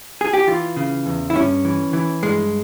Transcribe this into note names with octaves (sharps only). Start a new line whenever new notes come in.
G#4
G4
E3 F4
C#3
E2
E4
G2 C#4
E3
E3
G2 G#3